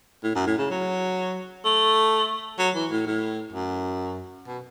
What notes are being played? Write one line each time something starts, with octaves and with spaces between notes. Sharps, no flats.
A2
F#2
A2
C#3
F#3
A3
F#3
E3
A2
A2
F#2
B2